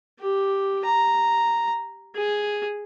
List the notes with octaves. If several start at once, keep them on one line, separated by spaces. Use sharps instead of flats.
G4
A#5
G#4